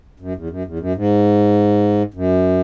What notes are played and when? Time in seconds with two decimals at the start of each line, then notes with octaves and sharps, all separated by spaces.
0.20 F#2
0.35 E2
0.50 F#2
0.65 E2
0.79 F#2
0.95 G#2
2.14 F#2